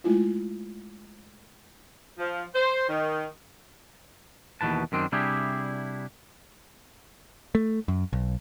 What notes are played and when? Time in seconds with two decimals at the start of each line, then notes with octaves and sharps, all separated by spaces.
0.04 G#3 A3 E4 F4
2.17 F3
2.54 C5
2.88 D#3
4.61 D#2 B2 E3 B4 A5
4.92 F#2 D#3 C4 D4
5.12 C3 G3 D4 E4 G4 G#4
7.55 A3
7.88 F#2
8.13 B1